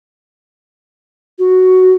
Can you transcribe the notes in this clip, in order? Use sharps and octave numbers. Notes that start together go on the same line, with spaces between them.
F#4